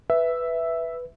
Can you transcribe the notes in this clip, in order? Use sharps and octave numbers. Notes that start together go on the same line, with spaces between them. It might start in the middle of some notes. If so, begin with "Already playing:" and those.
B4 E5